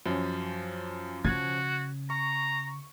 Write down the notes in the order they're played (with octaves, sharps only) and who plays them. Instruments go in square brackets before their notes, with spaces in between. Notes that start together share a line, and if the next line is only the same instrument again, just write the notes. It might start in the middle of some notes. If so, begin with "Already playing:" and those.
[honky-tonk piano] F#2 [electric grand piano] F3 C#4
[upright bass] C#3 [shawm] F#4 [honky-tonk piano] G#6
[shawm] A#5 [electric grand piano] C#6